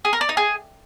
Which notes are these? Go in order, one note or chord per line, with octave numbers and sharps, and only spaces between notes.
G#4
A#4
D5
D#4
G#4